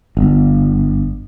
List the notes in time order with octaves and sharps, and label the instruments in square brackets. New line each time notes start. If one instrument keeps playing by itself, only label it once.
[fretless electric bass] G1